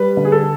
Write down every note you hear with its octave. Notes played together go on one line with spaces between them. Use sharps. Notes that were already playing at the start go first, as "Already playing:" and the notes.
Already playing: G3 B4
D3
G#4
A4